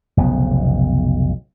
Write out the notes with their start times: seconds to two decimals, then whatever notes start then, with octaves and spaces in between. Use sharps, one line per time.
0.17 F1 B1 C#3 B3